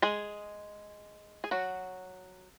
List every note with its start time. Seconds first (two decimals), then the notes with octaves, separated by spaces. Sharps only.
0.02 G#3 G#4
1.44 G#4
1.51 F#3 F#4